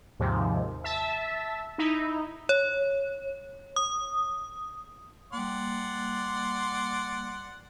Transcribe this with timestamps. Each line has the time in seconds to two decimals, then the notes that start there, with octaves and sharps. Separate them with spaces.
0.19 D#2 G#2 C3 F3
0.84 E5 A5
1.78 D#4 E4
2.49 C#5
3.76 D#6
5.33 G3 A#3 D5 F#5 C6